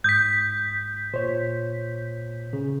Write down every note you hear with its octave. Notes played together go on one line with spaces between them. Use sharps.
G#2 D#6 G6 B6
A#2 C5 C#5
C#3